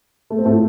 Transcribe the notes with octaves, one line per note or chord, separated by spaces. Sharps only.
A3
C4
A2 A3